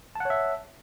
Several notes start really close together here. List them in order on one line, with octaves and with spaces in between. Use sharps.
A5 F#5 C#5 E5